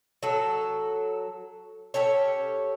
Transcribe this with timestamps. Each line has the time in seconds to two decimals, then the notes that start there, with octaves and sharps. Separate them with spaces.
0.23 F#3 A4
1.94 C#4 G4 A4 C#5